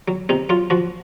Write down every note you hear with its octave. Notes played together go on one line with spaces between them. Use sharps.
F#3
C3 D#4
F#3 F4
F3 F#4